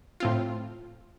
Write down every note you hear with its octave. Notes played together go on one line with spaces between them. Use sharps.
A2 C4 F4